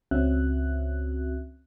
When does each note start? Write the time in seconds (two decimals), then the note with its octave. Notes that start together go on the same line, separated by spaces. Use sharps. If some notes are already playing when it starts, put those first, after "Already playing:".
0.11 C#2 C4 C#4 F#4 E5 F#6